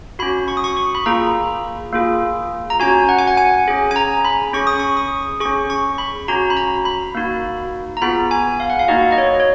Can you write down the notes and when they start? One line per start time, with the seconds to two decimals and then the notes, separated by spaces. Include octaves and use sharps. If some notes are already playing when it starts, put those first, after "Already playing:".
0.19 C#4 F#4 B5
0.48 C#6
0.57 D#6
0.64 C#6
0.77 C#6
0.95 B5
1.06 A#3 F4 G#4 A#5
1.93 A#3 F4 G#4
2.70 A#5
2.80 C#4 F#4 G#5
3.09 F#5
3.19 G#5
3.27 F#5
3.37 G#5
3.68 C#4 G#4
3.91 G#5
3.96 A#5
4.25 B5
4.53 C#4 G#4 C#6
4.67 D#6
4.80 C#6
4.97 D#6
5.40 G#4 C#6
5.45 C#4
5.70 C#6
5.98 B5
6.28 C#4 F#4 A#5
6.50 B5
6.57 A#5
6.85 B5
7.15 A#3 D#4 F#4
7.97 A#5
8.02 B3 F4 G#4 B5
8.31 G#5
8.60 F5
8.70 F#5
8.79 F5
8.88 A#3 D#4 F#4 D#5
9.12 D#5
9.18 C#5
9.40 C#5